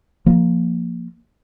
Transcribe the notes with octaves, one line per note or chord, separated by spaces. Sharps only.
F3 A#3